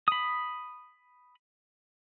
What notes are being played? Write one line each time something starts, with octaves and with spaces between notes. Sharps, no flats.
B5 D#6